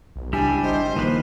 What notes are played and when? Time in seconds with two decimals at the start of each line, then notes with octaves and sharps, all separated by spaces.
0.16 B1
0.33 C#2 G3 D4 E4 G4 G#5
0.63 G#1 C5 D#5
0.96 A#1 D#3 F3 A#3 B4